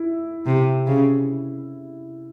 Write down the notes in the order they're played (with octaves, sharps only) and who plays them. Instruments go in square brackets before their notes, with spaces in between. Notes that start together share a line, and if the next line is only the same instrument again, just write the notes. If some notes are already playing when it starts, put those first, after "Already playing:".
Already playing: [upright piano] E4
[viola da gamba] C3
C#3